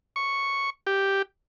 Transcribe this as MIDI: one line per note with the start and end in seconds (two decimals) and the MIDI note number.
0.16 0.70 85
0.87 1.22 67